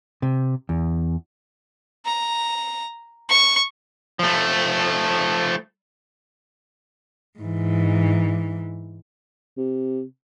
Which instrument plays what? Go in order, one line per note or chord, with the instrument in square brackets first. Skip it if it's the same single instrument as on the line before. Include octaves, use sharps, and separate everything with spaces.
[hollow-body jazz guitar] C3
E2
[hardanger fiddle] A#5
C#6
[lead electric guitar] F3 A3
[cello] G#2 E3
[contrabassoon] C3